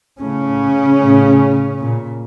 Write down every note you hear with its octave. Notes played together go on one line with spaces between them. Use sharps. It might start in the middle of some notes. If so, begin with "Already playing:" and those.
A2 C#3 C#4
A2
A#2